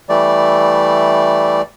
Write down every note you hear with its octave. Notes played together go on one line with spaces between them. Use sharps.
E3 G3 A3 D5